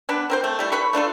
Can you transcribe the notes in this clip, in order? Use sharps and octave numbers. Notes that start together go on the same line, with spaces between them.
B3 D4 B4
C4 A#4 C5
A3
G3 A3 E4
B4 B5 C#6
A3 D4 F4 A4